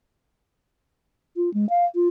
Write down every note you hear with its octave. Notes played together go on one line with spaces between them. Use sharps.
F4
G#3
F5
F4